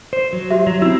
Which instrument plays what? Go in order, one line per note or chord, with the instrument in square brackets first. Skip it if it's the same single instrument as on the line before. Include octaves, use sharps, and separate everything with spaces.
[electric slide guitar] C5
F#3
[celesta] F#4 G4 E5
[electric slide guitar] F#3
[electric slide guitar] C4 E4 [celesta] E6